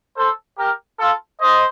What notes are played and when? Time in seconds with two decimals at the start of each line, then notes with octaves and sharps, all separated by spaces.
0.17 A4 C5
0.58 G4 A#4
0.99 F4 A4
1.41 C5 D#5